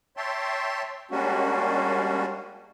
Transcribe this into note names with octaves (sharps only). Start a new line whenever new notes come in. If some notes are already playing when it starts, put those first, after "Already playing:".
C#5 E5 G5 A5 C6
G3 G#3 A#3 C#4 D4 F#4